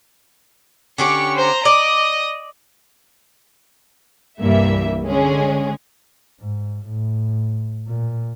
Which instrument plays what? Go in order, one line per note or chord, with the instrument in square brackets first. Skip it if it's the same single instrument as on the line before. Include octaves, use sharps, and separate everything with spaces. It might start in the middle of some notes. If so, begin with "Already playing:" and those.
[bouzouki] D3 C#4 G4 [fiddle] C#6
[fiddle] C5 A#5
[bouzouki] D5 [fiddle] D#5
[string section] C2 G2 E3 G3 A#3 E5
D3 G#3 C#4 G#4
[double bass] G#2
A2
A#2